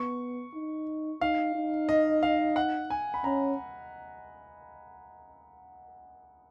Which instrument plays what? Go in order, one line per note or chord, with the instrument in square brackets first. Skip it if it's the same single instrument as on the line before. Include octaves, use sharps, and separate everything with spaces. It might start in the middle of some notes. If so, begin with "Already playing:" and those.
Already playing: [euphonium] B3 [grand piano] C#6
[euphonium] D#4
[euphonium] D#4 [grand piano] F5
[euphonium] D#4
[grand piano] D#5
F5
F#5
G#5
B5
[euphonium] C#4 [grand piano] A#5